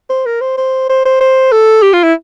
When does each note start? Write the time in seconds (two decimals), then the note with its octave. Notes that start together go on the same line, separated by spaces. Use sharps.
0.10 C5
0.26 A#4
0.41 C5
0.57 C5
0.90 C5
1.05 C5
1.21 C5
1.52 A4
1.83 G4
1.93 F4
2.04 E4